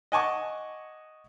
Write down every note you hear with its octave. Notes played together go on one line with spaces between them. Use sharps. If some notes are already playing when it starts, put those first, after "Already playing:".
D#5 F#5 G#5 A5 C#6 D6